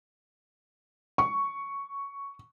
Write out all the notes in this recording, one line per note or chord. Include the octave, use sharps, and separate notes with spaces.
C#6